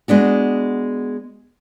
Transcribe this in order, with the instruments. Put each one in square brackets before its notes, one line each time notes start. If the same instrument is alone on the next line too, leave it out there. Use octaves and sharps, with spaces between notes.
[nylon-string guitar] G#3 B3 D4 F#4